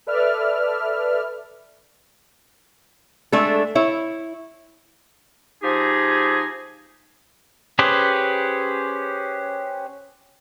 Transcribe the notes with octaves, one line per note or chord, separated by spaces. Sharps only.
A4 B4 D5 E5 F6
G#3 A3 D4 A4
E4 C#5
F3 D#4 G4 G#4
C#4 G4 G#4 B4 C5